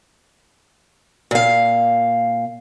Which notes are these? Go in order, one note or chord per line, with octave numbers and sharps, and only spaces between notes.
A#2 F5